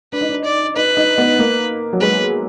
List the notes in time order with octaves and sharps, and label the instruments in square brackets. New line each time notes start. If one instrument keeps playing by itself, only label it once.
[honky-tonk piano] D4 [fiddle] B4
[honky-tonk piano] D#4
D4
[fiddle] D5
[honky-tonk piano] D#4 [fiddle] B4
[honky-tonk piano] D#4
B3
A#3
F#3
[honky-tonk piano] G#3 [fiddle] B4